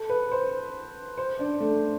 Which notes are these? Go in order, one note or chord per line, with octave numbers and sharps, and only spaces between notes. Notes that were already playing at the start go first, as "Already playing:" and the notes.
Already playing: A4
B4
C5
C5
D4
A3